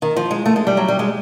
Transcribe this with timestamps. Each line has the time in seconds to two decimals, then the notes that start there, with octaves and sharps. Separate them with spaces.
0.02 D#3
0.16 F3
0.31 G#3
0.46 A3
0.56 G#3
0.67 G3
0.77 F#3
0.88 G3
0.99 G#3